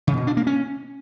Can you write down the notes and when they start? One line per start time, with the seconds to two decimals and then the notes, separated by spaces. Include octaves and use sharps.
0.07 C#3
0.17 B2
0.27 D4
0.37 A#3
0.47 C#4